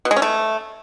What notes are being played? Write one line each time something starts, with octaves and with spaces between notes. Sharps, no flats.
B2
G#3
C#4
A3